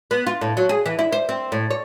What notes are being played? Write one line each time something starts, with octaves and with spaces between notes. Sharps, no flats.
B3
F4
A2
F#3
G#4
E3
E4
C5
C4
A2
C#5